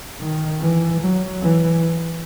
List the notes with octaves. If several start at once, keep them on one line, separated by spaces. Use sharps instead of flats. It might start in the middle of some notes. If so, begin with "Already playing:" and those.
D#3
E3
F#3
E3